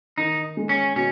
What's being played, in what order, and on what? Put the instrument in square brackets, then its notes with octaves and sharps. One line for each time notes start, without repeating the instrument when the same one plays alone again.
[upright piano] D#3 [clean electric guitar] D#4
[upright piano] G#3
[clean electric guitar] C#4
[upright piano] B2 [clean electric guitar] C#4